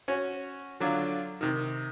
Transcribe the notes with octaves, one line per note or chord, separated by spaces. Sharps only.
C#4 F#4 C#5
D3 F#3 D4 F4
C3 D#3